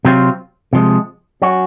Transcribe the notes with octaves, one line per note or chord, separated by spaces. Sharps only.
C3 F#3 C4 F4
C3 F3 G#3
F#3 C#4 F#4